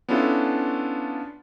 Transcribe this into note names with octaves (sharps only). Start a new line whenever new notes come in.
B3 C#4 D4 E4 F4 A4